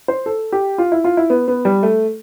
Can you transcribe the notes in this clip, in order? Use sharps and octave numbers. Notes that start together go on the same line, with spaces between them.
C5
A4
G4
F4
E4
F4
E4
B3
B3
G3
A3